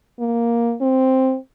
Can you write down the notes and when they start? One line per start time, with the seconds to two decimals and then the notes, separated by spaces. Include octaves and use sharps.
0.20 A#3
0.81 C4